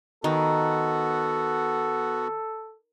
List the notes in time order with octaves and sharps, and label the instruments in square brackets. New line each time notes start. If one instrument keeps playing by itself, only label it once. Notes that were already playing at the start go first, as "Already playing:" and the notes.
[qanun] D#3 [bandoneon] B3 F#4 [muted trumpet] A4